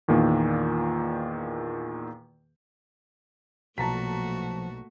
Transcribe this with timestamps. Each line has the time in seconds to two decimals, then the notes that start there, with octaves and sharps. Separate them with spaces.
0.08 E2 A#2 D#3 A#3
3.78 B1 A#2 F3 A3 F#4 A5 A#5 B6